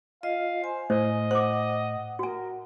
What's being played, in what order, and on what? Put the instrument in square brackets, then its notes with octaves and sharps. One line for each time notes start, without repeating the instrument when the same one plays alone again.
[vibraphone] F4 D#5 [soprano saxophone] F5
[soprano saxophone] C5 [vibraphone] G#5
[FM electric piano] A2 [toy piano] C5 [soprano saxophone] D#5
[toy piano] C5 D6 [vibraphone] F#5
[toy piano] F#4 G#5 [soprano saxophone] A#4